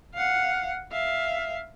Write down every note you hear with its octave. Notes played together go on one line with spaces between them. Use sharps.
F5 F#5
E5 F5